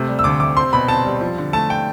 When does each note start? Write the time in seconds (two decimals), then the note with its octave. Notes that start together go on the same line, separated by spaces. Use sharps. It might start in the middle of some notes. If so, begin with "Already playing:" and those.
Already playing: C3 A3
0.08 G3
0.19 E6
0.24 D2 D6
0.40 C3 D6
0.57 C4 C6
0.73 B2 B5
0.88 C4 A5
1.05 G3
1.21 F3
1.38 D3
1.53 A3 A5
1.70 G5